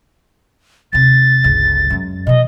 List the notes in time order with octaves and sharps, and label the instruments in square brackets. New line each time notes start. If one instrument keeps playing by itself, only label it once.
[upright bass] D#2 C3 [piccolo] A6
[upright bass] G1 C#2
F#2 G#3
[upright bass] B2 E3 [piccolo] D#5